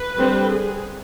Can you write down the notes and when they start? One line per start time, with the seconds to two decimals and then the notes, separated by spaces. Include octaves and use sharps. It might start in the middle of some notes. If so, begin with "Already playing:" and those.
Already playing: B4
0.18 D3 G3 C4
0.50 G#4